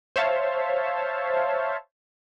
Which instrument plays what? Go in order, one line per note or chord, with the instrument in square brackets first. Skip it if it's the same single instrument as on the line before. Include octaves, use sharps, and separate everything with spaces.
[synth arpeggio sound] C5 C#5 E5 F5 A5